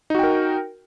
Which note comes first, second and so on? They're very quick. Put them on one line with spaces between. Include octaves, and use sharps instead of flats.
D#4 F#4 G5 A#4